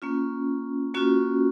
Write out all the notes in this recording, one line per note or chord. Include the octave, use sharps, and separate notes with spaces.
A#3 C#4 F4
A#3 C#4 F4 F#4